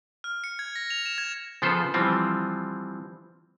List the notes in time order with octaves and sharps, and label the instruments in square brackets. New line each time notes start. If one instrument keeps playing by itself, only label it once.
[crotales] F6
C#7
G#6
A#6
F7
E7
G#6
[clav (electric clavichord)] C#3 F3 B3 A4 C5
E3 F3 G3 C4